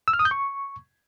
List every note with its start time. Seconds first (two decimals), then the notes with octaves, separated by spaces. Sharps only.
0.08 E6
0.13 F6
0.19 D#6
0.25 G6
0.31 C#6